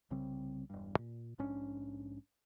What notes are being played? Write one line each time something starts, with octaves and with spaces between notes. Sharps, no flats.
C2 C#3 G3 C4
E1 G2
A#2
A#1 G#2 C#4 D4